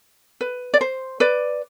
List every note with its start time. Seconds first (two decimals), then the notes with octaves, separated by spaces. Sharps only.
0.41 B4
0.74 D5
0.81 C5
1.20 B4 D5